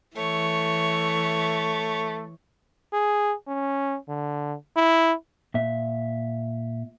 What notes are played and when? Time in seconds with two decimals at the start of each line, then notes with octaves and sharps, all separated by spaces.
0.17 E3 A3 C#5
2.93 G#4
3.48 C#4
4.08 D3
4.76 E4
5.54 A#2 E5